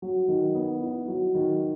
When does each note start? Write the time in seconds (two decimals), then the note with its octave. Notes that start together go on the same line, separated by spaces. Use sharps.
0.02 F#3
0.28 D#3
0.55 B3
0.81 E4
1.08 F#3
1.35 D#3